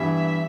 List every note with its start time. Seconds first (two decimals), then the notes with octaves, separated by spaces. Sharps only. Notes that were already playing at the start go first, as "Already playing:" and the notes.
Already playing: G2 E3 G3 B3 E4 E5